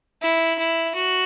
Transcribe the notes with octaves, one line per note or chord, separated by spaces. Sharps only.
E4
E4
F#4